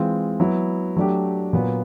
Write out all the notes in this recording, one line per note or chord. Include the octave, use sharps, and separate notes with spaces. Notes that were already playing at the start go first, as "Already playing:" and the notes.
Already playing: E3 G#3 C4 F4
F#3 B3 E4
F#3 A3 D4 G4
A#2 F#3 B3